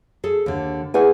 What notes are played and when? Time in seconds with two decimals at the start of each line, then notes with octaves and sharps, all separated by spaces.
0.24 G#4 A4
0.46 D#2 D3
0.94 E2 G#4 F#5 G#5